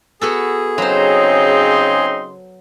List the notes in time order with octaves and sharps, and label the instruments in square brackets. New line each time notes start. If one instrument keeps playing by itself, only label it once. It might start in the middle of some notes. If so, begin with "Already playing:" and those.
[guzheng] B3 F#4 A4 [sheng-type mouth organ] G#4
[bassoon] C#3 [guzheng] F#3 C5 [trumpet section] C4 D#4 C6